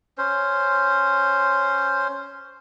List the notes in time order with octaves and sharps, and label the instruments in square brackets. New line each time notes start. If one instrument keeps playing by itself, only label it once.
[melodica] C#4 C5